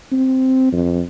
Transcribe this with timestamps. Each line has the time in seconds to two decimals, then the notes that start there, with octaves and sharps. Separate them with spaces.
0.12 C4
0.72 F2